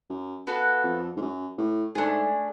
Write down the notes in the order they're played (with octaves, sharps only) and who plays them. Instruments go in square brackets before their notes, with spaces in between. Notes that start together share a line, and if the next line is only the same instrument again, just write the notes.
[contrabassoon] F#2
[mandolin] B3 F#4 A4 F5
[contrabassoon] F2
G#2
F#2
A2
[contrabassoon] G#2 [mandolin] A3 D4 G#4